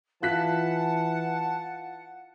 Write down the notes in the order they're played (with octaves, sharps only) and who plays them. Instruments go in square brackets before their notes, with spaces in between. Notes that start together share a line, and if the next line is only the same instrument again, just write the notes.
[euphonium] E3 [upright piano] F4 F#6 B6 [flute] F#5 [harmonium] A5